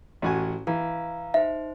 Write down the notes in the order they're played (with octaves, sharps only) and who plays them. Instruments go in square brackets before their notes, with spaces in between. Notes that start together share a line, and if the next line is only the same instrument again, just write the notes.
[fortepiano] A1 F#4 G#5
[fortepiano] E3 [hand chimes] F5 A#5
[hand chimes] D#4 C5 [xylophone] E5